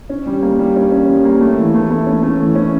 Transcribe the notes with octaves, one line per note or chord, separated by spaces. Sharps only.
C#4
G3
A#3
G3
C#4
C#4
G3
A#3
A3
E3
A3
A3
C#4
A3
E3
C#4